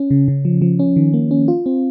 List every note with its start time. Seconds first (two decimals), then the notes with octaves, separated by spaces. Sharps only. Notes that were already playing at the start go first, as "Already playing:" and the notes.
Already playing: C#4
0.11 C#3
0.28 C#3
0.45 F3
0.62 F3
0.79 C#4
0.96 D#3
1.13 A#3
1.31 C#4
1.48 F4
1.66 C4